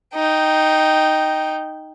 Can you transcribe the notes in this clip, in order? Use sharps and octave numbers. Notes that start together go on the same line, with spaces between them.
D#4 G5